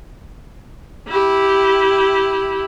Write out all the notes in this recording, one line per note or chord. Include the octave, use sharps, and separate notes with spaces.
E4 G4